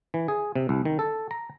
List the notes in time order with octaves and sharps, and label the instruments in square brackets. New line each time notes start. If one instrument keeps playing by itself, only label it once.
[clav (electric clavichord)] E3
G#4
C3
C2
D#3
A4
A#5